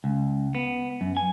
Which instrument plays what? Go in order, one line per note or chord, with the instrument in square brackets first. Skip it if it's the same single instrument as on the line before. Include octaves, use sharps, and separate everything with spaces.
[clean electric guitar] C#2
B3
F#2
G#5